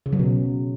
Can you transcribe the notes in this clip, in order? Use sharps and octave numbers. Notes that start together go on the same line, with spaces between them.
C#3
F#3
B2